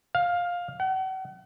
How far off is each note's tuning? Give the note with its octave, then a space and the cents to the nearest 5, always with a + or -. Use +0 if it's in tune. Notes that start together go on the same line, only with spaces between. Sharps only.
F5 +10
F#5 +40